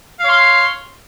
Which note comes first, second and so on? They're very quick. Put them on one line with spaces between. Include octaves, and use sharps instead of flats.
F5 C#5 C6